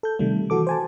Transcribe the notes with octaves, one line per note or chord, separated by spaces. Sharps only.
A4 G6
C3 D#3 G3 A3
E3 F#4 A4 D6
C5 G#5 A5